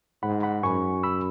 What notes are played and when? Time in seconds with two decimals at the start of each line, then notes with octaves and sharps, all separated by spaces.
0.23 G#2 F#5 B5
0.43 F#5 B5
0.63 F#2 G#5 C#6
1.03 B5 E6